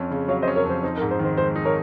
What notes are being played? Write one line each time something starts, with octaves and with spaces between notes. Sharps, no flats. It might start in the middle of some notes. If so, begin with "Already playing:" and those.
Already playing: F2 C#4
C#3
F#3 C#5 F5
C5 D#5
C#4
A#4 C#5
F2 C5
D#4 C5
A#4
G#2
C5
D#3
C5
G#3 C5
D#4
A#4 C#5